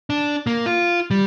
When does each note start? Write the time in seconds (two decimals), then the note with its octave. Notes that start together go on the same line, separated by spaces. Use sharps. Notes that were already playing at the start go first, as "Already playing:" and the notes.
0.10 D4
0.47 A#3
0.66 F4
1.11 G3